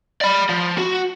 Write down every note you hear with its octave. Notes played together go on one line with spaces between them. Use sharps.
D5 B5
F3
F#4